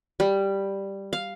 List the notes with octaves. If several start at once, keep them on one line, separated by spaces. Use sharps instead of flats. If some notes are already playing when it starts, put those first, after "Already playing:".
G3
F5